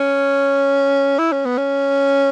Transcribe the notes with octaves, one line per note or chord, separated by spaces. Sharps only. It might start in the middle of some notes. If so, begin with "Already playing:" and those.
Already playing: C#4
E4
C#4
B3
C#4